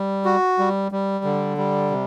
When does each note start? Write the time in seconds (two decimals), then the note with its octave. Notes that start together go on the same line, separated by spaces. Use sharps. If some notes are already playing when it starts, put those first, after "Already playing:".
Already playing: G3
0.25 F#4
0.59 G3
0.92 G3
1.24 D3
1.57 G3
1.91 C3